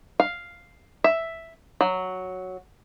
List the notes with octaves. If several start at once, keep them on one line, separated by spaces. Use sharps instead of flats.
F5
E5
F#3